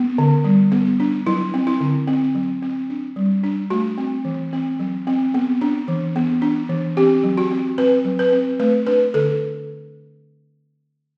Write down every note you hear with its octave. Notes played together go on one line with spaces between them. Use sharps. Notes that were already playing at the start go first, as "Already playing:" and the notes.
Already playing: B3
D3
G3
B3
D4
F#3 E4
C4
E4
D3
C4
F#3
C4
D4
G3
D4
A3 F#4
C4
E3
C4
F#3
C4
B3
D4
E3
B3
D4
E3
C4 G4
F#3
F#4
C4
C4 B4
F#3
B4
C4
A3 B4
D4 B4
D3 A4